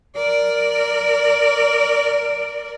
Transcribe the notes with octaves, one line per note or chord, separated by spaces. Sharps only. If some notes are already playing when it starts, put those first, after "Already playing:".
A#4 D5